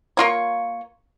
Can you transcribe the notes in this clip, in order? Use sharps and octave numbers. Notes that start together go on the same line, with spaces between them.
A#3 F4 C#5